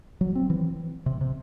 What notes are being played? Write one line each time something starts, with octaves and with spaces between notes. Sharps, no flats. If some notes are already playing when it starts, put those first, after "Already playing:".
F#3
C4
E3
C3
C3